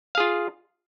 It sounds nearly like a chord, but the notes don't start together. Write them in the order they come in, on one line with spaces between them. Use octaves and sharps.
F5 G#4 F4